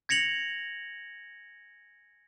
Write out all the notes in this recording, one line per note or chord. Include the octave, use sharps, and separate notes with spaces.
G#6 A#6 C#7 F7 F#7